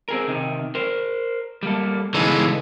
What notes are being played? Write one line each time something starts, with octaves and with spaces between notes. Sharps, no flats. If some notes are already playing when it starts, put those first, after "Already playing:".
C4 G#4 A#4
C3 D#3
A#4 C5
G3 A#3 A4
C#3 E3 G#3 D#4 A4